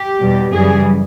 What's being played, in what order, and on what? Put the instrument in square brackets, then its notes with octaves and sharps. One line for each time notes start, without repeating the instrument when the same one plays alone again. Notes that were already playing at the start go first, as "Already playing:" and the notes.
Already playing: [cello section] G4
E2 B2 G3
F#2 C#3 E3 G3 G#4